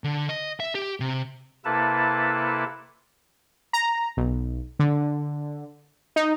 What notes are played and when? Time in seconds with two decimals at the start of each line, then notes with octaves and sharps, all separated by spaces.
0.04 D3
0.29 D#5
0.60 E5
0.75 G4
1.00 C3
1.65 C3 A#3 E4 A4 B4 A5
3.73 A#5
4.17 B1
4.79 D3
6.16 D#4